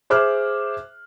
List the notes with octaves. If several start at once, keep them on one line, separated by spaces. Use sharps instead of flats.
G#4 C5 E5 D6 F6 F#6